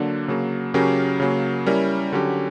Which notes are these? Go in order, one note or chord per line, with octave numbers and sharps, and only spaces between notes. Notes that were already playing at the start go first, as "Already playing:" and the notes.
Already playing: D3 F#3 A#3 D4
C#3 F#3 A#3
C#3 F#3 C#4 G4 A#4
C#3 F#3 A#3
G3 C#4 E4 A#4
D3 F#3 C#4 G4